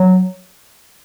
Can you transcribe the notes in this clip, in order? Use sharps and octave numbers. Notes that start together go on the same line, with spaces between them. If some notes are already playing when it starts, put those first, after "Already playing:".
Already playing: F#3